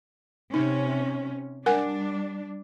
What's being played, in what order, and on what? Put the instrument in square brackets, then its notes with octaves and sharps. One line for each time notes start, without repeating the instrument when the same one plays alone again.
[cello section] C3 C#4 [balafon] D#4
[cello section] G3 D4 [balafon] A#4 F#5 G#5